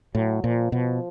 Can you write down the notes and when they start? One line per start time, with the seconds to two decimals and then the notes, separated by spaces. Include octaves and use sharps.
0.15 A2 F#3
0.44 A#2 F3
0.72 B2 F3